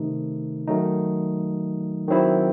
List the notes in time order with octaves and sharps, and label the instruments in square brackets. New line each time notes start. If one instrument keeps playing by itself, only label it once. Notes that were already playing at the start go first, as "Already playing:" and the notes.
Already playing: [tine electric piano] C3 D#3 A3 D#4
D#3 F#3 A3 D#4
D#3 F#3 C4 E4